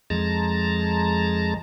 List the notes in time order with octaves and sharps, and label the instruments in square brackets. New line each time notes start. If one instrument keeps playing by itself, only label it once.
[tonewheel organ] F2 G#3 A5 A#5